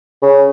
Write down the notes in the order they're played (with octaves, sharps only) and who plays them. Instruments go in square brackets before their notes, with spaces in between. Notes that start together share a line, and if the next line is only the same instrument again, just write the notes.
[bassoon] C#3